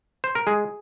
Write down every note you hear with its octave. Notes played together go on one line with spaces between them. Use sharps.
C5
A#4
G#3 G#4